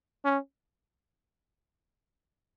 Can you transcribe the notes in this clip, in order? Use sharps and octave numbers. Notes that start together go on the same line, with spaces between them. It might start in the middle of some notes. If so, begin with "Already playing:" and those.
C#4